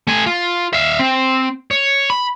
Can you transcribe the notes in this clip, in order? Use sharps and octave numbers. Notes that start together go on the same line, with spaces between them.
A3 G#5
F4
E5 F5
C4
C#5
B5